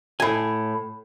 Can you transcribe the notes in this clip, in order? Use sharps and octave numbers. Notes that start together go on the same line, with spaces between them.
A2 G#5